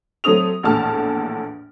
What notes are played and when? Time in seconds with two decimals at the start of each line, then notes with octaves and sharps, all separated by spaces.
0.24 F#3 A3 C4 D#6 F7
0.63 A#1 E2 A2 A5 F6